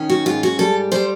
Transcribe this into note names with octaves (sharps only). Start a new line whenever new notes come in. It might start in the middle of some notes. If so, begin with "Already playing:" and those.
Already playing: D#3 C#4
F#4
G#2 F4
F#4
G3 A4
G3 C5